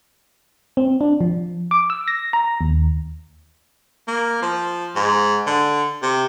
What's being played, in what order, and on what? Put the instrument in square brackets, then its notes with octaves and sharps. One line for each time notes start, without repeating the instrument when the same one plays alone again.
[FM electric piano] C4
D4
F3
D6
E6
A#6
A#5
D#2
[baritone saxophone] A#3
F3
G#2
D3
C3